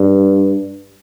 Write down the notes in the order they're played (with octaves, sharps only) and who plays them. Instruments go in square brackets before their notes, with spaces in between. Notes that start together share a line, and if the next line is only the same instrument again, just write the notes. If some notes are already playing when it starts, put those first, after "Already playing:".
Already playing: [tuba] G2